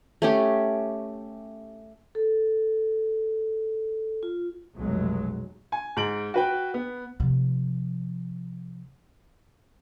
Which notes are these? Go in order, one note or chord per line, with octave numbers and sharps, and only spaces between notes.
A3 C#4 G4
A4
F4
F1 B1 B2 F#3 G#3
G#5
G#2 D7 F#7
F#4 B4 G5
B3
C3 F3